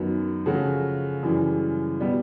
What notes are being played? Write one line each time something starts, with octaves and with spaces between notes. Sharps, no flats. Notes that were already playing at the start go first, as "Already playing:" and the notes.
Already playing: F#2 D#3 F#3 B3
C#3 F3 A3 C#4 F#4
F#2 C#3 E3 G3
B2 G3 B3